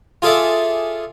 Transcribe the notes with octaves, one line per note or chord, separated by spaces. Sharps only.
F4 G#4 A4 D5 E5